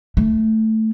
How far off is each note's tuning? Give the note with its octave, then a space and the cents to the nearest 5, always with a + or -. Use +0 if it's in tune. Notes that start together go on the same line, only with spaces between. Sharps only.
A3 +0